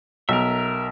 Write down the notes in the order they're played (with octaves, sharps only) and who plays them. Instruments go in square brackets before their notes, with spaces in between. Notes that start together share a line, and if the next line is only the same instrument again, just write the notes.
[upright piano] B1 [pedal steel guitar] A#4 E5